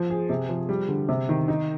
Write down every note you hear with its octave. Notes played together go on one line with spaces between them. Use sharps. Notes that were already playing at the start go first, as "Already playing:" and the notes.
Already playing: F3
G#4
C3
F3
G3
D3
C3
D#3
D#4